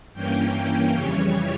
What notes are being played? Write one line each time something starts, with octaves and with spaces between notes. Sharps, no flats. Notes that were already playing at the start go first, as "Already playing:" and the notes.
G2 E3 A#3 C#4 G5
F2 C#3 E3 G3 C#5